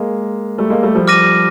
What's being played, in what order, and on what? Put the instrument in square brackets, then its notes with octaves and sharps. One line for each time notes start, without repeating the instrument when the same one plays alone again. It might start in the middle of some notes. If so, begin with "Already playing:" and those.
Already playing: [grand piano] G#3 A#3
G3 A3
G#3 A#3
G3 A3
F3 G3
[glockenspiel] D6 F6 A#6 D#7